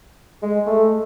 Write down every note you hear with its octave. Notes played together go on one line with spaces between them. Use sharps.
G#3
A3